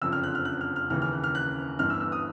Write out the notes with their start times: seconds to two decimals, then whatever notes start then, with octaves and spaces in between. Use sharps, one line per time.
0.01 F#1 F2 D3 F3 E6
0.12 F6
0.23 F#6
0.35 F6
0.45 F#6
0.61 F6
0.76 F6
0.90 D#2 C#3 E3 F6
1.02 F6
1.13 F#6
1.24 F6
1.35 F#6
1.79 G1 G2 E3 F6
1.90 E6
2.01 E6
2.12 D#6